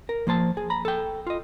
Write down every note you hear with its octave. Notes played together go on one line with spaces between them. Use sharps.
A#4
F3 A#3 C5 A5
G#4
A#5 B5
A4 G5
F4 D#5